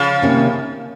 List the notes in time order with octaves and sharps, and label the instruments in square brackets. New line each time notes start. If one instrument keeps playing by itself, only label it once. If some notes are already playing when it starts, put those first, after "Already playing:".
Already playing: [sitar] C#3 F3
[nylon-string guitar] C3 D#3 A#3 C#4